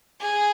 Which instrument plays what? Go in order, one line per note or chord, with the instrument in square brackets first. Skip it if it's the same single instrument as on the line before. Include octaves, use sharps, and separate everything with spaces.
[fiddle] G#4